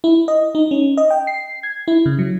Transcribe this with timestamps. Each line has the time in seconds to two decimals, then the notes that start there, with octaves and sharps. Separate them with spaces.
0.04 E4
0.28 D#5
0.55 D#4
0.71 C#4
0.97 D#5
1.10 G5
1.27 C7
1.63 G#6
1.88 E4
2.06 C#3
2.19 F#3